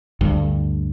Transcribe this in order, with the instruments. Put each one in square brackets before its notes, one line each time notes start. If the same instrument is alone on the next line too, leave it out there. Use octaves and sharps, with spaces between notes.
[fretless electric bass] D2 G2